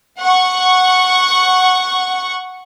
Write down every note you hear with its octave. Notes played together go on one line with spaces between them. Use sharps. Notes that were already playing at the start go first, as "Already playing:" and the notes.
F#5 C#6